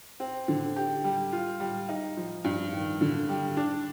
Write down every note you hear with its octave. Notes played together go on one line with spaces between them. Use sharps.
C4
D3
G4
G3
F4
G3
D#4
F3
G2
D#3
D3
G3
D4